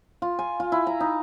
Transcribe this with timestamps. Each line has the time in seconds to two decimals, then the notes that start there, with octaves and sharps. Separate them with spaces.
0.22 F4
0.39 G#5
0.60 F4
0.72 E4
0.87 A#5
1.00 D#4